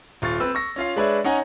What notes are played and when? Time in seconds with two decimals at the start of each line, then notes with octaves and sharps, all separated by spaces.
0.22 D#1 F4 C#6 A6
0.40 C4 B4 E6
0.55 C#6 A#6
0.76 C#4 F4 F5
0.96 G#3 D4 B4 C#5 E5
1.24 C#4 D#4 F#5 G#5 A#5